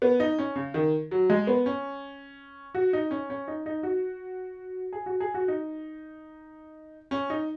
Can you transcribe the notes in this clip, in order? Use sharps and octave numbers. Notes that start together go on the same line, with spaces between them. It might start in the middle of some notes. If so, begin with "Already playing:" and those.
B3
D#4
C#4
C#3
D#3
F#3
G#3
B3
C#4
F#4
D#4
C#4
C#4
D#4
D#4
F#4
G#4
F#4
G#4
F#4
D#4
C#4
D#4